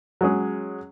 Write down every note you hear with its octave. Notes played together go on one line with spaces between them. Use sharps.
F#3 G#3 C#4 G#4